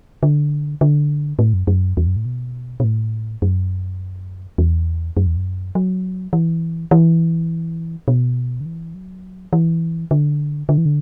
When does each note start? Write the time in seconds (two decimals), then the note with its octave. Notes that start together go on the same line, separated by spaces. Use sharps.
0.23 D3
0.81 D3
1.39 A2
1.54 F#2
1.67 F#2
1.97 E2
2.07 F#2
2.17 A2
2.25 B2
2.80 B2
2.84 A2
3.42 F#2
4.58 E2
5.17 F#2
5.27 E2
5.36 F#2
5.75 F#3
6.33 E3
6.91 E3
8.08 B2
8.61 D3
8.66 E3
8.95 F#3
9.53 E3
10.11 D3
10.69 D3
10.78 E3
10.86 D3